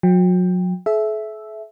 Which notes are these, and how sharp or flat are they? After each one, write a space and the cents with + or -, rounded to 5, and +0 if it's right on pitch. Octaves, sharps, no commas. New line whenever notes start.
F#3 -35 G5 +15
A4 -45 E5 +0